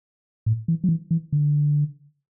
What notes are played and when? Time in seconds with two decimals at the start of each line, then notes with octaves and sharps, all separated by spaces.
0.46 A2
0.68 E3
0.84 F#3
0.89 E3
1.11 E3
1.32 D3